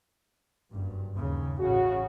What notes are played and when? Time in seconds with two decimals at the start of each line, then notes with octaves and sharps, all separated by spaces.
0.71 F#1 G2
1.16 D#2 C#3
1.59 A1 A2 C#3 F#4